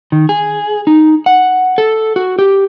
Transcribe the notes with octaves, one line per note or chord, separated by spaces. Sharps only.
D#3
G#4
D#4
F#5
A4
F#4
G4